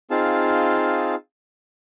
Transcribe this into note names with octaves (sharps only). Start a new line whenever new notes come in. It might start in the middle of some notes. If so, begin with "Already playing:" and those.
C4 D#4 F4 G#4 F5 A5